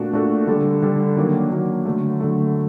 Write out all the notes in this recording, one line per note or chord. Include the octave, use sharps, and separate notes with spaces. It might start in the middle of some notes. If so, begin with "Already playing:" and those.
Already playing: A#2 A3 D4 F#4 A4
A#2 A3 D4 F#4 A4
D3 G3 D4 A4
D3 G3 D4 A4
D#3 F#3 A#3 D4
D#3 F#3 A#3 D4
D3 F#3 A3
D3 F#3 A3